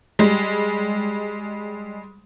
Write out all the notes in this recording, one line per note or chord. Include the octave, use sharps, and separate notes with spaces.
G3 G#3